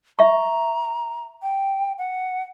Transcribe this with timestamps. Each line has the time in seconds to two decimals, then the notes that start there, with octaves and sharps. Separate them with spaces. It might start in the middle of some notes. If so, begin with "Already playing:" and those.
0.19 E5 A#5 C#6
1.43 G5
1.98 F#5